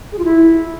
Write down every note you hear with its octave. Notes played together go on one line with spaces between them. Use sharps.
G#4
F4
E4